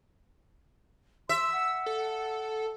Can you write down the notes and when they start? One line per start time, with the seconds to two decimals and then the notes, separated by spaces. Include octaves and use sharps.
1.29 E5 C6 E6
1.53 F#5
1.86 A4